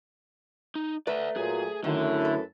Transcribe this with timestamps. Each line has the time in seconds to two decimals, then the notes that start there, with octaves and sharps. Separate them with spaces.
0.75 D#4
1.07 A3 B4 D5 E5 A#5
1.36 A#2 F#3 G#4
1.84 F#2 D3 D#3 A3 E4
2.21 A4 B4